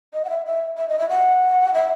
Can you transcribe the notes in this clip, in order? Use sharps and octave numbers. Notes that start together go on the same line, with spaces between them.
D#5
F#5
E5
E5
E5
D#5
E5
F#5
E5